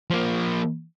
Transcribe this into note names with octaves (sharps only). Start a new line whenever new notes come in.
F3 A#3